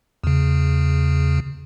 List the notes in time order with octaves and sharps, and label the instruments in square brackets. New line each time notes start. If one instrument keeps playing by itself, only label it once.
[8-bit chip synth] E2 C#3